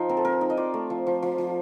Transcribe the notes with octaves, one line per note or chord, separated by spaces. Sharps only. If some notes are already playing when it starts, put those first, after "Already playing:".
Already playing: F3 D#4 F4 D#5
C4 A#4
A4
C4 A#4
D#4
D#5
F4 D5
A3
F3
F3
F3
F3